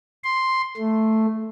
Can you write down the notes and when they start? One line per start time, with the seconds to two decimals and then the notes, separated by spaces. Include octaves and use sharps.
0.24 C6
0.77 A3